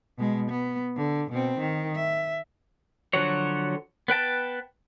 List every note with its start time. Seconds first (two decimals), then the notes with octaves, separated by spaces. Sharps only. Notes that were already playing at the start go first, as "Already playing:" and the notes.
0.19 B2 G#3
0.51 B3
0.97 D3
1.31 B2 C4
1.59 D#3
1.95 E5
3.13 D3 F3 F#3 F#4 C#5
4.08 B3 B4 G5 A5